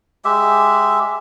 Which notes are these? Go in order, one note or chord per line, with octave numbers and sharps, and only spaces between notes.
G#3 G4 E5